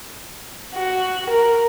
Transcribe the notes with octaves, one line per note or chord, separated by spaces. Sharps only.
F#4
A#4